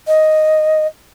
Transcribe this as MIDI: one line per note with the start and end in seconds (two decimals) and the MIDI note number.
0.07 0.87 75